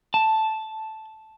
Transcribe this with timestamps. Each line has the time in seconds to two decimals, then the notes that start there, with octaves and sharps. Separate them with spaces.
0.14 A5